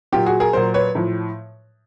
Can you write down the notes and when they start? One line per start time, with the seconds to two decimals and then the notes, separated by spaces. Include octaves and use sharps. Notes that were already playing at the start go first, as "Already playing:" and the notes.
0.12 A#2 F#3 F4 G4
0.26 F#4 G#4
0.40 G#4 A#4
0.53 A#2 F#3 A#4 C5
0.74 B4 C#5
0.95 A2 F3